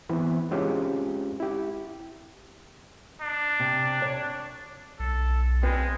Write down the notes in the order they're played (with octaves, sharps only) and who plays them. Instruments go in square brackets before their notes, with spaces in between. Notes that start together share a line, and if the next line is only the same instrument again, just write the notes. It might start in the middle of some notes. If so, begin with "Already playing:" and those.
[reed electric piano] E3 B3 C4
G#3 C4 C#4 F4 G4 G#4
E4 G4
[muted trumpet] D4
[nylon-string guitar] C3
C#5 A5
[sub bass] B1 [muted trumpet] A4
[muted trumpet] G#3 [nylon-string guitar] C4 F4 B4